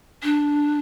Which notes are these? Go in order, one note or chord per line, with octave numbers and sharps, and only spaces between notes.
D4